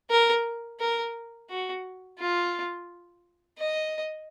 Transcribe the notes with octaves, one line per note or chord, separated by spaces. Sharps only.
A#4
A#4
F#4
F4
D#5